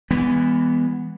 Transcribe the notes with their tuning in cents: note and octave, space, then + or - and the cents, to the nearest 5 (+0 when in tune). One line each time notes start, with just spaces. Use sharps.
E3 +0 G#3 -35 B3 +0